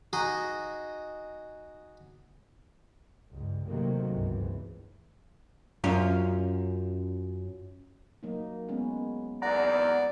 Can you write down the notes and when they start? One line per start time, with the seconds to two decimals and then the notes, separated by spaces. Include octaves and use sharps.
0.13 D#4 F#4 G#4 D#5
3.30 C#2 G2
3.67 D#2 C3 D#3 F#3 A3 A#3
4.12 G1 C#2 G#2 E3
5.84 F#2 C#4 F4
8.23 F#3 A#3 D#4
8.69 G#3 B3 C#4
9.42 G#1 E2 D5 F#5 A#5